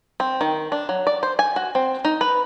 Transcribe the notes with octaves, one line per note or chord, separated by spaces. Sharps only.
C4
D#3
D4
F#3
D5
C5
G#5
F#4
C4
D#4
B4